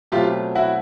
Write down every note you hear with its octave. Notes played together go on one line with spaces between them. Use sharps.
B2 F#3 A3 C4 F4 G4
E4 F#4